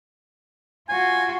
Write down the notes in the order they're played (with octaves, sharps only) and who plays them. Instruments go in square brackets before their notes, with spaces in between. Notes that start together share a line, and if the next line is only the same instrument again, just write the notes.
[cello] F4 F#4 [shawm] G#5